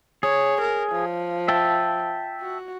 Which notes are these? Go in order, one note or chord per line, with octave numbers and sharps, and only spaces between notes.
G#4 C#5
A#4
F3
E5 G5 A5
F#4